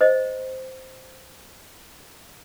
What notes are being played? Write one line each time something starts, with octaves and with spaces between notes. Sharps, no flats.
C5 D#5